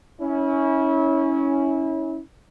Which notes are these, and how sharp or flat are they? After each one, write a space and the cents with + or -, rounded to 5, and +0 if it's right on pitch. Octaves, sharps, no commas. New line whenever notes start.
C#4 +0 E4 -30